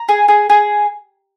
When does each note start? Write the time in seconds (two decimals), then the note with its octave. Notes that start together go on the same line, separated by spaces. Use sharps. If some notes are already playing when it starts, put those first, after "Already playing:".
Already playing: A#5
0.09 G#4
0.28 G#4
0.50 G#4